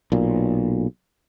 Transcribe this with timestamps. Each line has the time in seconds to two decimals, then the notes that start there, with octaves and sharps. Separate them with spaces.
0.12 B1 A#2